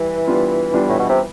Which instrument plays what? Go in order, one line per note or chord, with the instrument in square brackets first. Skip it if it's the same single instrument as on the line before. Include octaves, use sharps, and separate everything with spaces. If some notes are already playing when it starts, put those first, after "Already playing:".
Already playing: [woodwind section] E3 [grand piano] G3
[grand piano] G3 B3 D4 F4
G3 B3 D4 F4
[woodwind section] A2
B2
C3